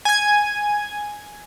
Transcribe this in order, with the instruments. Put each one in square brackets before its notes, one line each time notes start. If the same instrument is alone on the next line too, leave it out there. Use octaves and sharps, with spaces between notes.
[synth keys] G#5 G#6